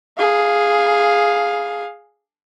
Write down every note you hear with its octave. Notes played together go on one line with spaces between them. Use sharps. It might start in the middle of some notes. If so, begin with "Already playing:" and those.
G#4 F5